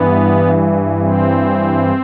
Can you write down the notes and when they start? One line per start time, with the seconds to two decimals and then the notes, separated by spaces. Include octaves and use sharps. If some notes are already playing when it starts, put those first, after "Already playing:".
Already playing: G2 E3 B3
0.97 C4